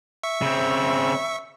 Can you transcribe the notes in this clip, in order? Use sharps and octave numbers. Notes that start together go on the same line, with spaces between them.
E5 C#6
C#3 C4